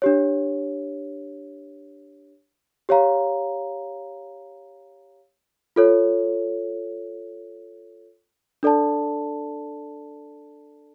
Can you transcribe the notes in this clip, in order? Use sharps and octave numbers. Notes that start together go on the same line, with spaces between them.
D4 G4 C#5
G4 C#5 F5 A#5
F4 A4 C#5
D4 A4 D5 A5